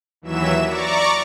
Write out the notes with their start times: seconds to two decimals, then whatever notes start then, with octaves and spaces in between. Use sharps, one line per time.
0.22 D#2 E3 F#3 E5 E7
0.67 D5 A#5 C#6 D6